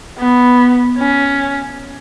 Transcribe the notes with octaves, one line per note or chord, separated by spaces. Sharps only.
B3
C#4